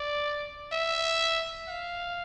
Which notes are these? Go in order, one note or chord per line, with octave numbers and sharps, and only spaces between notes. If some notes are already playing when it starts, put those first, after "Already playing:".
Already playing: D5
E5
F5